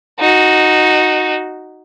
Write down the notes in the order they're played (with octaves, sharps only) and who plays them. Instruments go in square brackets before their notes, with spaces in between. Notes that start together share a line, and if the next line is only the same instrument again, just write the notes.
[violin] D#4 F#4